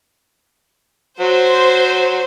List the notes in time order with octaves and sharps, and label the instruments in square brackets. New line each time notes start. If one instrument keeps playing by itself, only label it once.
[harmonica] F#3 [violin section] C5